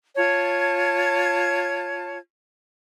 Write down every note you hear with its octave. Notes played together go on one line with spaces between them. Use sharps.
F4 C#5 A5 G#6